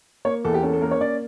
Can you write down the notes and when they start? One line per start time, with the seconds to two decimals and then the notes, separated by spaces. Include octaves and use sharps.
0.25 A#3 C#5
0.45 E2 A4
0.54 G4
0.63 C#4 A4
0.73 A4
0.82 A#3 A#4
0.91 C#5
1.01 C#4 D5